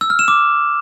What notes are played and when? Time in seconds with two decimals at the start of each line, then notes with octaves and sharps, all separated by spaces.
0.01 E6
0.10 F6
0.19 E7
0.28 D6